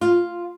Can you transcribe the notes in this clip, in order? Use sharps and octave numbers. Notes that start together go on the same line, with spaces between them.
F4